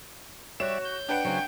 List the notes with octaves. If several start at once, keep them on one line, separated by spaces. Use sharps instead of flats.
G3 F#4 C#5 D5 E5 E7
G6
D4 B4 F#5 G5
C#3 F#3 C5